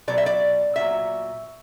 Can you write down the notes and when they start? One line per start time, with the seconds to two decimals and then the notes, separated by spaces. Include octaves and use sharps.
0.08 B2 F#3 D5
0.18 E5
0.26 D5
0.76 A#2 F#3 E5